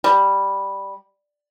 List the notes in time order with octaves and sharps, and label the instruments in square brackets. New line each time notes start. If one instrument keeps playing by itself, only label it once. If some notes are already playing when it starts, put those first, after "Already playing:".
[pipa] G3